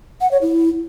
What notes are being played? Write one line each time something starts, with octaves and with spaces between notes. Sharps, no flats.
F#5
C#5
E4